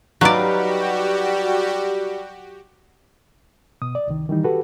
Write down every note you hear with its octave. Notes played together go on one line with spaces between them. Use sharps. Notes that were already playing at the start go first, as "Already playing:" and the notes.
F#3 G3 D#4 F#4 G4 B4 D5 F5
B2 D#6
D5
C2 D#3
D#3 E3 G3 D#4
F#4 G4 A4 B4